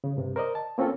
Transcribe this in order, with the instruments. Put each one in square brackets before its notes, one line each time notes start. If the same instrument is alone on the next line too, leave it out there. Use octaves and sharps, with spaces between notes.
[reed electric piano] C#3
G2 C3
A#4 C5 D5 D#5
A5
A#3 C4 C#4 F4 A4